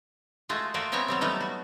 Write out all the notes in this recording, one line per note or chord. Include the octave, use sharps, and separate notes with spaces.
G#3 A3 F4 F#4
A3 A#3 F4 F#4 D5
G#3 B3 C4 C#5 E5 A#5
F#3 G3 C4
F#3 G3 A3 B3 D#4
F#4